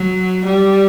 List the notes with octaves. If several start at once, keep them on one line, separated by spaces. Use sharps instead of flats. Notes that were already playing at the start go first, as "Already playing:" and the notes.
Already playing: F#3
G3